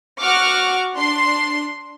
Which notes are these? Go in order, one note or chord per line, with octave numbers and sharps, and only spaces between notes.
F#4 F#5 C#6 D6 F6
D4 C6